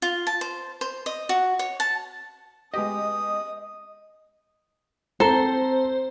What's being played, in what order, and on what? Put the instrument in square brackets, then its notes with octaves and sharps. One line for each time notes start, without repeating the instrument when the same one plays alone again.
[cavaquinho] F4
A5
C5
C5
D#5
F#4
C#5
A5
[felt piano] G#3 B3 G4 [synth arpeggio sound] D#5 [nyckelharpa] D#6
[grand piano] C4 A#5 [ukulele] A4 [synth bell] C5